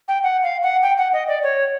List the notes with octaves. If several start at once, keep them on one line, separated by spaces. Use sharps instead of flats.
G5
F#5
F5
F#5
G5
F#5
D#5
D5
C#5